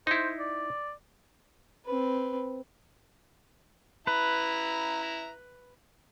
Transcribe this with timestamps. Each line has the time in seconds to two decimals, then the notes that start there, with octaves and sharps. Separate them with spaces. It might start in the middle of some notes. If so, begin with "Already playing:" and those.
0.07 D#4 E4 C5
0.39 D5
1.86 C4 B4
4.07 E4 B4 A#5